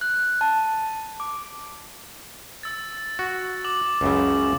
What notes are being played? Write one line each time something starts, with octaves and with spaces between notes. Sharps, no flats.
F#6
A5
D6
E6 A6
F#4
D6 F#7
C#2 F#2 C#3